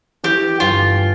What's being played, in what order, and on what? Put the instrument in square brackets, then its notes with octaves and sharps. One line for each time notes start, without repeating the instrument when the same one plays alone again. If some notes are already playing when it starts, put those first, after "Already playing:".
[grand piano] E3 [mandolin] G4
[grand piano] G1 [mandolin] F4